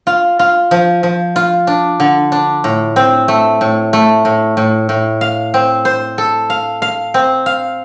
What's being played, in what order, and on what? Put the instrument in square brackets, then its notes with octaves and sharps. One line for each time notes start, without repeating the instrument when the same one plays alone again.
[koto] F4
F4
F3
F3
F4
D4
D3
D4
A2
C4
A3
A2
A3
A2
A2
A2
F5
C4
C5
A4
F5
F5
C4
F5